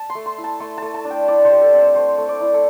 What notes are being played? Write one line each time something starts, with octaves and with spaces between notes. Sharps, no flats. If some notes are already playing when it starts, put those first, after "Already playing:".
Already playing: A5
C6
A3
C6
E4
A5
A3 C6
A3 A5
A5
D4
G5
E4 D5
C5
G3
A4
C4
C5
A3 C5
A3
D5
E4
A4